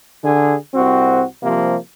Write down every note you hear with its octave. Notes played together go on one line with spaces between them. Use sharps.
D3 G#4
C2 C4 F#4
C3 F3 G3 A#3